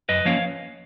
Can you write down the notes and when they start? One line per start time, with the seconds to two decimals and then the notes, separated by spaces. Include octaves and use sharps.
0.09 F#2 B4 D#5
0.25 F3 A#3 C#4 C#5 F5